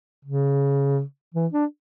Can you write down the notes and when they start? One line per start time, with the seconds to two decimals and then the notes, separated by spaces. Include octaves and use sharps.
0.25 C#3
1.34 E3
1.53 D4